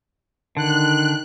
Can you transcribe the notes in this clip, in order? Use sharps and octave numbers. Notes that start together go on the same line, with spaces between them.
D3 D#3 F#6